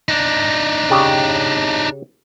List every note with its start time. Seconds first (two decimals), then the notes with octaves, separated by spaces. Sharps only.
0.09 D4 D#4
0.90 C#3 G4